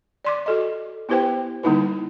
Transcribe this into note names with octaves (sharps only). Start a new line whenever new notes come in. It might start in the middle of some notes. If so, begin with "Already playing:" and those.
D5 C6 D6
F#4 A4 D#5
B3 E4 G4 B4 C5 G5
D3 G3 A#3 D#4 E4 B4